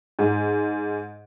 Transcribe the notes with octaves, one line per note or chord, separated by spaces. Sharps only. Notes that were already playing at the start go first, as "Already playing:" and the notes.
G#2